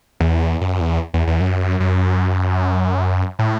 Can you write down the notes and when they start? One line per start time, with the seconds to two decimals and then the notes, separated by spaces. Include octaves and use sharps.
0.20 E2
0.61 F#2
0.81 E2
1.14 E2
1.27 E2
1.40 F#2
1.80 F#2
3.39 A2